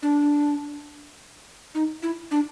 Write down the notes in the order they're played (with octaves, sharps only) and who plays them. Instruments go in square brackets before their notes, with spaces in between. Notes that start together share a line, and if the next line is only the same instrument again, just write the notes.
[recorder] D4
D#4
E4
D4